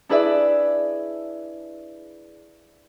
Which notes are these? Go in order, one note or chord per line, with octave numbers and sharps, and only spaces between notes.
D4 E4 G#4 B4 D5 E5